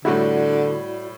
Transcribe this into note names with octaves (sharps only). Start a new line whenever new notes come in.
A2 D3 G3 E4 F#4 D5